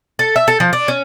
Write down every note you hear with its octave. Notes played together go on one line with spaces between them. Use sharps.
A4
E5
A4
F3
D4
C#4